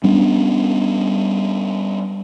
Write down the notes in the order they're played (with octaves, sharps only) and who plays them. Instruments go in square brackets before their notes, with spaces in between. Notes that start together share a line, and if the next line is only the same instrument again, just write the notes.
[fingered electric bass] G3 B3 C#4 D4